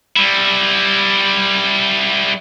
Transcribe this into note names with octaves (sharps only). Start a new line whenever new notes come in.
G3 E4